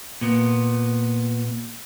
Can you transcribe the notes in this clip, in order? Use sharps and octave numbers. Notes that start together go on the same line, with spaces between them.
A#2 B3